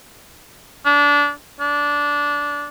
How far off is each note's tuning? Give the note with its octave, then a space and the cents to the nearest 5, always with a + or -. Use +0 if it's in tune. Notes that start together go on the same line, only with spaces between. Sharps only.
D4 -25
D4 -15